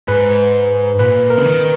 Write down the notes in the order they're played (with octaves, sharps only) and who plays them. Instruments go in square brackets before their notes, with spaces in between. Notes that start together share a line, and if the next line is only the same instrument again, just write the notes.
[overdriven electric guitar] G#2 [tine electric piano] B4
[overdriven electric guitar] A#2 [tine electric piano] B4
[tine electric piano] A#4
[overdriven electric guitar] C#3
D#3